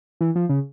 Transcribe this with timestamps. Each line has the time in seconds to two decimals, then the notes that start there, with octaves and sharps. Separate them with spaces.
0.21 E3
0.35 F3
0.49 C#3